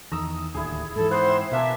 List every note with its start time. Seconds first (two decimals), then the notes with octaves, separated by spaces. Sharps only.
0.12 E2 D#3 A#5 D#6 E6
0.54 D1 D#2 D3 E4 G#4
0.96 G#2 E3 A4
1.11 B3 C5 F#5
1.25 C4 E5
1.51 B2 A#3 D4 E5 G#5